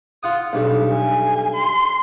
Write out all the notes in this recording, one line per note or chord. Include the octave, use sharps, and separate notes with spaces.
F4 F#5 D#6
B1 G2
G#5
C6